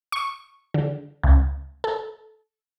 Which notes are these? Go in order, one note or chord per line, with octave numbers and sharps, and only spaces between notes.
C#6
D3
C#2
A4